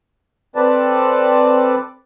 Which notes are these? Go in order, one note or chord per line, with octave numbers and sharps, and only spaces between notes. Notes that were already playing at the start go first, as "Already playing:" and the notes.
C4 A4 B4 D5 A5